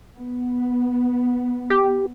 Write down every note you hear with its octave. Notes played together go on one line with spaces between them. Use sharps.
B3
G4